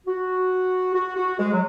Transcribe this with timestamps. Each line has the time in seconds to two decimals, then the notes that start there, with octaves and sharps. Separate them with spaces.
0.07 F#4
0.94 F#4
1.16 F#4
1.38 G#3
1.52 F#3